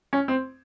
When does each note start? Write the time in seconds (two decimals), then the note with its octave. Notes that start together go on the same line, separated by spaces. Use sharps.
0.13 C#4
0.28 C4